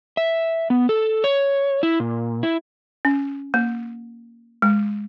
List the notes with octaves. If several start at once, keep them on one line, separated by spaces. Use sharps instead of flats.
E5
B3
A4
C#5
E4
A#2
E4
C#4
A#3
G#3